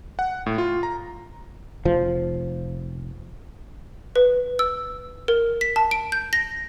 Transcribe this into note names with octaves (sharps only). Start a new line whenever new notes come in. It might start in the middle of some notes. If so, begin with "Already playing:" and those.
F#5
A2
F4
A#5
F1 F3
B4
E6
A#4
B6
A5
D7
G6
A#6